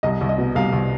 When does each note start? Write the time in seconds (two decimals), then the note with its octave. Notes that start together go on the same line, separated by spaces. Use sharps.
0.03 C2 D#5
0.21 C2
0.29 D#5
0.38 B2
0.55 C2 F5
0.73 C2